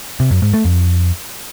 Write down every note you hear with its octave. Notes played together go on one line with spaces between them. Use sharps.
C3
F#2
G#2
A3
F2